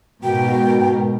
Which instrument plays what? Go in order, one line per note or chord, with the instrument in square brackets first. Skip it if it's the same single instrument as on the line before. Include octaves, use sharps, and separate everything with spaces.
[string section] G#2 B2 A#4 [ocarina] F#4 [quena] G5